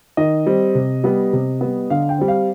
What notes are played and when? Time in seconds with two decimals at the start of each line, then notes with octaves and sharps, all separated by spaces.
0.17 D#3 D#5
0.46 G3 C4
0.75 C3
1.04 G3 B3
1.33 C3
1.61 G3 B3
1.90 D3 F5
2.09 G5
2.19 G3 C4
2.28 F5